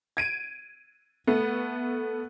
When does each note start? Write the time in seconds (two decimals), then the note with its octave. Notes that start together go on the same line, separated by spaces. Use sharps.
0.17 G#6 D7 D#7
1.27 A3 B3